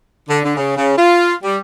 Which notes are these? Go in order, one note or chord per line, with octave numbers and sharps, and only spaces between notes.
D3
D3
C#3
C#3
F4
G3